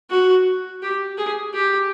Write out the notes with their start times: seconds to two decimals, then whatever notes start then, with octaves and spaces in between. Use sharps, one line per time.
0.10 F#4
0.82 G4
1.18 G#4
1.54 G4